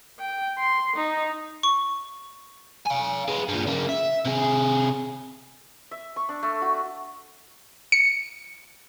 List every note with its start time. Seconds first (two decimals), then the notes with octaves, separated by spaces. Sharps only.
0.20 G5
0.58 C6
0.96 D#4
1.63 C#6
2.87 F5 G#5
3.28 G#3 B3
3.49 G2 A#2
3.67 C#3 A#3
3.89 E5
4.26 C3 G#4
5.91 E5
6.16 C#6
6.29 D4
6.43 A3
6.62 F#4
7.92 C#7